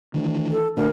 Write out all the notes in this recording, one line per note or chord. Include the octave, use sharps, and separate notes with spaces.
D2 D#3 E3
A4
D2 A#2 A#4